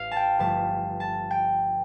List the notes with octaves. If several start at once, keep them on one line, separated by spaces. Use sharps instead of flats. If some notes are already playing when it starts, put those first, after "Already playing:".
Already playing: A1 F5
G5 A5
G1 G2 F3 A3 A5
A5
G5